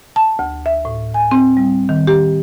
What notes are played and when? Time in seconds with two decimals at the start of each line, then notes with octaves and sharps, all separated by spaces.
0.16 A5
0.39 D2
0.66 E5
0.85 A2
1.14 G#5
1.31 C4
1.57 G3
1.89 D#3
2.07 G4